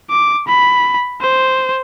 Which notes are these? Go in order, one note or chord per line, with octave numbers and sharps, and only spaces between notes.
D6
B5
C5